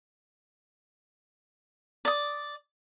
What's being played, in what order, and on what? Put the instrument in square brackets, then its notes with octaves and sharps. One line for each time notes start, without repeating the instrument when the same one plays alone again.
[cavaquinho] D5 D#6